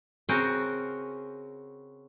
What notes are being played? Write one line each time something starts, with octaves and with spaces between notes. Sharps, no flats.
C#3 C4 F#4 A#4 G5 G#5